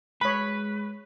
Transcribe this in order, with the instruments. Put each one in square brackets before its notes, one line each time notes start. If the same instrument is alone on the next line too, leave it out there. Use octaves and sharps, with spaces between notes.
[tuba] G#3 [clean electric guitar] B4 [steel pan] C#5 B5